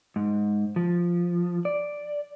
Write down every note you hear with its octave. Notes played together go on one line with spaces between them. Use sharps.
G#2
F3
D5